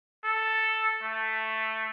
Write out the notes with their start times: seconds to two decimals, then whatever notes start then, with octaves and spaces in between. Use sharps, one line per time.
0.25 A4
1.03 A3